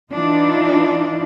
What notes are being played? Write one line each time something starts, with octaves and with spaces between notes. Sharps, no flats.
E3 D4 D#4 F4